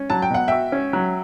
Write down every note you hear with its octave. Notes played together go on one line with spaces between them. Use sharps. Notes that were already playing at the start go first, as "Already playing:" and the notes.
Already playing: C#4
F#3 A5
G5
B2 F#5
F#4 E5 G5
C#4
F#3